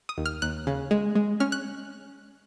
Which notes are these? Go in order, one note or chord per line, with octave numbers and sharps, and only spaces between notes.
D#6
D#2
F6
D#2 F#6
C#3
G#3
G#3
C#4 F6
F#6